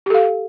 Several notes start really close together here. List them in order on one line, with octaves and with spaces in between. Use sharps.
G4 A4 F5